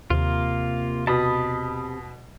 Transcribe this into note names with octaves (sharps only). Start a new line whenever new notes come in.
D#2 C3 A#3 F4
B2 A5 B5 D#6